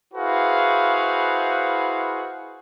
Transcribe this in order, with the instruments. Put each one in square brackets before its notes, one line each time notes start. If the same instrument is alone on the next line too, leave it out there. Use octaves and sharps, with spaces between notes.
[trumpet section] E4 F#4 G#4 B4 C5 F5